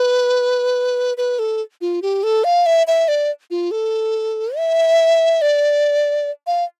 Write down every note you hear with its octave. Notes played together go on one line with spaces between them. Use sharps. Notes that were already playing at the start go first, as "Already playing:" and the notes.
Already playing: B4
B4
A4
F4
G4
A4
F5
E5
E5
D5
F4
A4
E5
D5
F5